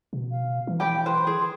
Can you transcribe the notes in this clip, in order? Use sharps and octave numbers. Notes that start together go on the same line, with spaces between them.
B2
F5
E3
G4 G5 B5
B4 C5 C6
G#4